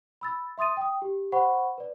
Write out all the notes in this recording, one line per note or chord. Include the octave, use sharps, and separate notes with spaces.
B5 E6 A6
E5 C6 D#6 A6 D#7
G5 D#6
G4
C5 F#5 B5 C#6
B4 D5